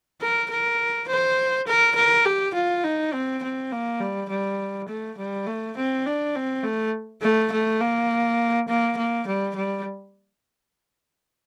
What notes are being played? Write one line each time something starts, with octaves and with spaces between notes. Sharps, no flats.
A#4
A#4
C5
A#4
A#4
G4
F4
D#4
C4
C4
A#3
G3
G3
A3
G3
A3
C4
D4
C4
A3
A3
A3
A#3
A#3
A#3
G3
G3